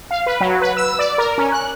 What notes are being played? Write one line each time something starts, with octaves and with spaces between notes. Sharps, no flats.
F5
B4
F#3
B4
E6
D5
A#4
C#4
F#6